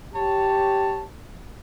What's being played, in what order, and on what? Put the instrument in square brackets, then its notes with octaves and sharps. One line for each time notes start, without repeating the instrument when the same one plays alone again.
[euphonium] G4 [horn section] C#5 A5